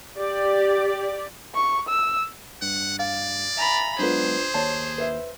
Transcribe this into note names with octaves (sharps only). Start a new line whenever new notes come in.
G4 D5
C#6
E6
G2 F#5
D5 F5
E5 G#5 A#5 B5 A6
F#3 G#3 B3 D4 F4 G#4 B4 C5
D#2 C#5 A5
B4 E5